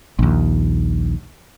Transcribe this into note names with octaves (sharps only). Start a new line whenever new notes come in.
A#1 D#2